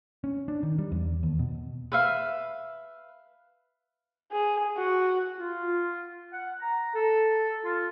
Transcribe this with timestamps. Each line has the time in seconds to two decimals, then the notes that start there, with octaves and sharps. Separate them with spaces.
0.24 C#4
0.48 D4
0.63 D#3
0.79 G3
0.92 E2
1.23 D#2
1.39 B2
1.92 B4 E5 F5
4.32 G#4
4.77 F#4
5.38 F4
6.32 F#5
6.60 A#5
6.94 A4
7.64 F4